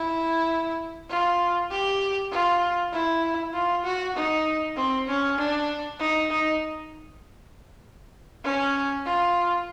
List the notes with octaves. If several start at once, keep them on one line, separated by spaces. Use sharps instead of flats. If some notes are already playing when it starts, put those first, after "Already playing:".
Already playing: E4
F4
G4
F4
E4
F4
F#4
D#4
C4
C#4
D4
D#4
D#4
C#4
F4